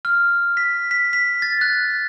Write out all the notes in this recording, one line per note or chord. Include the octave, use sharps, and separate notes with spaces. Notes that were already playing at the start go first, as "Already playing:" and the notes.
F6
B6
B6
B6
A6
F#6